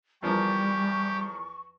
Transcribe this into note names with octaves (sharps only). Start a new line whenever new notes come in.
E2 F3 G3 A#3 G4 C#6